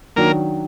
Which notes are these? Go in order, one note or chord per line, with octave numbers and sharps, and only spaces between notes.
D#3 F#3 A#3 D4 A#4